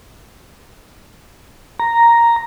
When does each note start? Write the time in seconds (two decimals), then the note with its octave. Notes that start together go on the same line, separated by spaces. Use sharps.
1.80 A#5